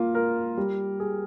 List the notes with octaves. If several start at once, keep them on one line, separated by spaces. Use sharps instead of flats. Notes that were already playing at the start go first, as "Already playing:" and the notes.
Already playing: A#3 F4
A#4
G3
G#4